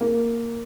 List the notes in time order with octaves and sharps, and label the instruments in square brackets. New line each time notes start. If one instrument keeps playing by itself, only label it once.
[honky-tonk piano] A#3